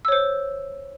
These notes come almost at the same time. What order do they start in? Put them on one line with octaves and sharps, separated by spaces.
E6 C#5 C5